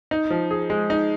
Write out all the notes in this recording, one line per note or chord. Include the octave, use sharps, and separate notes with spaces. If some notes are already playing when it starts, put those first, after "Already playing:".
D#4
F3
G#4
G#3
D#4